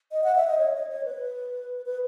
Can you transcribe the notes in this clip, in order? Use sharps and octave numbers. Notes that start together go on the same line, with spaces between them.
D#5
F#5
E5
D#5
C#5
D#5
C#5
B4
B4